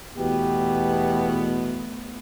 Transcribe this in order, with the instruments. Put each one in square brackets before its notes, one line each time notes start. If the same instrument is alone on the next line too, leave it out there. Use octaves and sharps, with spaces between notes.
[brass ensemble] E2 B2 [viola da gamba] A3 B3 [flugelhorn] G4